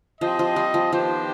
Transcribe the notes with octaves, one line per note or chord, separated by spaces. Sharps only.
F3 C4 G4 C5 D#5
F3
G3
F3
D#3 F3 B3 D4 G4 C5